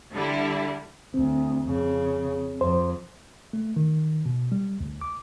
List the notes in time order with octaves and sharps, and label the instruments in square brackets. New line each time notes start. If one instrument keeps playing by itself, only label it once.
[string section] D3 G3 E4
[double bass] D2 [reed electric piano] C4
[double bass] F2 C#3
[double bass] F2 [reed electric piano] C5
[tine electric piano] A3
D#3
B2
G3
D2
D6